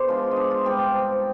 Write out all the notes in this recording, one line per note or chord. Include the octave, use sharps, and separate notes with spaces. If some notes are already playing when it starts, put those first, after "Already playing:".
Already playing: B3 G#4 C5 D5
F3 G#3 D4 F4
D#5
D5
F4
G#2 G3 C4 F4 G4